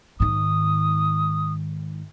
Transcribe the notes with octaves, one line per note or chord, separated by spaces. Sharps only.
G#2 D#3 D#6